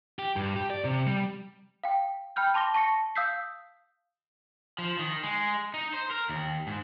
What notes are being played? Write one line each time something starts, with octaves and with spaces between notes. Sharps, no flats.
G4
G2
G4
D5
C3
G3
F5 G5
G5 B5 F6 G6
A5 C6 D6 A#6 G7
A5 C#6 A#6 C#7
F5 D#6 E6 G6 B6 C7
F3
D#3
G#3
D#4
C5
A#4
D#2
G#2